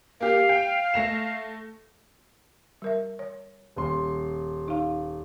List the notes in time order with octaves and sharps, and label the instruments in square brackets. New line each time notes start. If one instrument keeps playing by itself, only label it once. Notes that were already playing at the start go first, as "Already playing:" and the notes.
[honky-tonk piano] A#3 G4 [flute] F5
[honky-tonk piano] G5
A3 A#6 E7
[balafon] G3 A#4 E5
C#5
[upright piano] D#1 C6
[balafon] D#4 F5